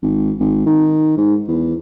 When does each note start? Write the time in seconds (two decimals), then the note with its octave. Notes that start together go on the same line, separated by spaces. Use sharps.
0.02 G#1
0.40 G#1
0.66 D#3
1.17 G#2
1.48 E2